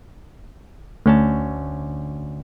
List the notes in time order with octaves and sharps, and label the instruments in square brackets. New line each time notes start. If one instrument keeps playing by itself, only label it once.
[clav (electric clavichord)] D2 C#4 A5 [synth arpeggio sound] A3